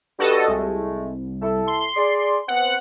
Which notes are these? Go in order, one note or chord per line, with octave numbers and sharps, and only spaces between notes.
G2 F#4 A4 D#5
C2 G#3 A3
E4 A4
C6
G#4 D5
B3 C4 F#5